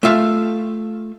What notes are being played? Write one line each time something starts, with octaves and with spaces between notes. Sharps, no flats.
A3 F4 E5 F5